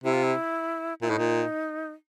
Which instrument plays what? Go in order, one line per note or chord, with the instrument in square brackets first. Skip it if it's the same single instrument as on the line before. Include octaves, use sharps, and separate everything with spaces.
[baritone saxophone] C3 [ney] E4
[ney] F4
E4
[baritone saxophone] A#2 [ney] E4
[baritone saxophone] A2 [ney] D#4
[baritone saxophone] A#2